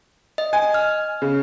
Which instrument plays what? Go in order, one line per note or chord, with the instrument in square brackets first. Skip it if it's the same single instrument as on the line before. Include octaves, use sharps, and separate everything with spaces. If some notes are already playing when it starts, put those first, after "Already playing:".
[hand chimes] D#5
[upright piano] G#5
[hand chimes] F6
[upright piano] C#3